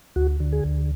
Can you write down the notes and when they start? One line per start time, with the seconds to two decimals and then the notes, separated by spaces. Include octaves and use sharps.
0.16 D2 F#4
0.40 D3
0.53 G#4
0.65 D2